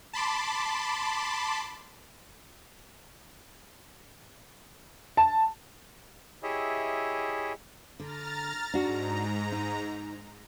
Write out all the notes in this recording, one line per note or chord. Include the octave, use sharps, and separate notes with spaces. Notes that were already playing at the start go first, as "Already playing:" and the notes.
A5 B5 C6 D6
A5
E4 G4 G#4 C#5 D#5 E5
D3 A#5 F6 A6
G#2 D4 F#4 A#5
D#4